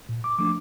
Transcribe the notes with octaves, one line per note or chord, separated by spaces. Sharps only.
A#2
D6
F3 A3 D4 D6